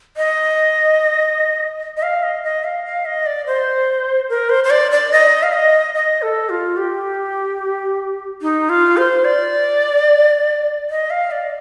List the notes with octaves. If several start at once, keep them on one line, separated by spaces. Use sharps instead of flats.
D#5
D#5
F5
D#5
D#5
F5
F5
D#5
D5
C5
A#4
C5
C5
D5
D5
D#5
F5
D#5
D#5
A4
F4
G4
D#4
F4
C5
D5
D#5
F5
D5